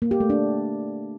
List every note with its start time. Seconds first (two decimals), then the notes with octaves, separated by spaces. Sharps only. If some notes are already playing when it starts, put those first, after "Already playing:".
0.02 A#3
0.11 G4
0.20 A3
0.30 D4